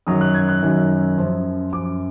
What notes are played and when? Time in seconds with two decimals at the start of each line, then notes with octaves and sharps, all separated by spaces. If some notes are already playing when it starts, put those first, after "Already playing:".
0.07 F#2 D#3 F#3 D#6
0.21 F#6
0.34 G#6
0.49 F#6
0.62 F#2 D#3 F#3
1.18 F#2 F3
1.73 F#2 F3 D6